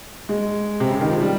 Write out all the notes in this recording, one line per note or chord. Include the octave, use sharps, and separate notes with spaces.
G#3
C3
C#3
D#3
F3
G3